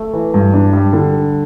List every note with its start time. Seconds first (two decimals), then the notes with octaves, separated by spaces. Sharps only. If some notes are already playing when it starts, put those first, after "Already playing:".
Already playing: A3
0.13 E3
0.34 G2
0.54 D4
0.73 G3
0.93 D3